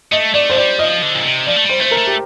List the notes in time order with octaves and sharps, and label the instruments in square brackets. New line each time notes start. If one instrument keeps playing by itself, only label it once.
[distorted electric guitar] A3 [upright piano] D#5
[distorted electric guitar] A3 [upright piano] D5
[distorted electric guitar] F3 [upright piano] C5
[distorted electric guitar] G3 [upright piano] D5
[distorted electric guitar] F3 [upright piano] D#5
[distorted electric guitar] D3
A#2
C3
[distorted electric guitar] F3 [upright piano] D5
[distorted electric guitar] A3
G3
[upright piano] C5
[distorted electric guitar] A3 [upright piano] C5
[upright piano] A#4
[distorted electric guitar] A3
[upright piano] G4